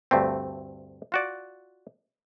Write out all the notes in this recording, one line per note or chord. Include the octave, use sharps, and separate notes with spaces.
D2 G2 A3 C4
F4 F#4 D5